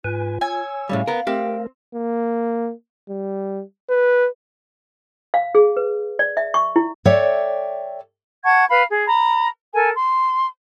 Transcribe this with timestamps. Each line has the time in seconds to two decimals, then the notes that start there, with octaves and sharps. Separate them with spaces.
0.04 G#2 F4 B4 G#5
0.41 C#5 G#5 E6
0.89 A2 C#3 G3 F5
1.07 B3 A#4
1.27 A3 C4 G4 A#4
1.95 A#3
3.09 G3
3.89 B4
5.34 F5
5.55 G#4
5.77 B4
6.19 D5
6.37 E5
6.54 C#6
6.76 E4
7.05 A4 C#5 D5 E5 G5
8.44 F#5 A5 C#6 G#6
8.69 B4 F5 B5
8.90 G#4
9.06 A#5 B5
9.73 A4 A#4 G#5
9.96 C6